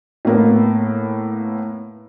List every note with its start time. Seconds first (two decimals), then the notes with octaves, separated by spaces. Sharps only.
0.25 A2 A#3 B3